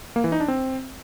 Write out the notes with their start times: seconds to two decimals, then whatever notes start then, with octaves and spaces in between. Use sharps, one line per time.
0.16 A#3
0.24 E3
0.32 D#4
0.40 D4
0.48 C4